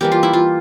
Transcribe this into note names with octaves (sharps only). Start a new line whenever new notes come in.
E3 G3 A#3 G4
F4
E4
F4